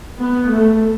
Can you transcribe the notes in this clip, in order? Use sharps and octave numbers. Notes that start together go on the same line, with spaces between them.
B3
A3